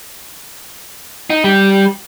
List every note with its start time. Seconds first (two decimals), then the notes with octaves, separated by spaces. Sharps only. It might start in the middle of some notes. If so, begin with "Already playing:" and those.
1.30 D#4
1.44 G3